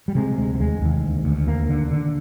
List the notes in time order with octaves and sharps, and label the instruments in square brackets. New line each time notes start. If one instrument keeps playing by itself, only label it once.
[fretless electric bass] G3
C3 G#3
D2 G#3
G3
D#2 G#3
D#2
D2
D2
D#2 A#3
D3
D3